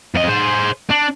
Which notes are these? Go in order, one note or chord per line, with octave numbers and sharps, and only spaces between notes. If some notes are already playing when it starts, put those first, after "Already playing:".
F2 D#5
G#4 C5
D4